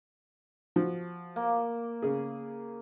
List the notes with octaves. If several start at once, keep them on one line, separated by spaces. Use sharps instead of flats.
F3 F#4
A#3
C#3 G#4